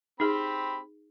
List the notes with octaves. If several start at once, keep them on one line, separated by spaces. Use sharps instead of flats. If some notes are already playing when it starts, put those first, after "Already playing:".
C4 D#4 G4 G#4 B5